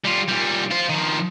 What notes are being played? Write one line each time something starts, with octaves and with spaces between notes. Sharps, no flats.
G3 F4
A#2 G3
F4 C5
D#3 F3